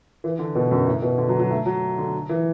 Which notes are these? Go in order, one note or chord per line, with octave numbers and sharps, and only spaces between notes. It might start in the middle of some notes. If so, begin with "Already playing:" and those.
E3
D3
B2
F#2
A2
B2
D3
F#3
F#3
A3
F#3
D3
E3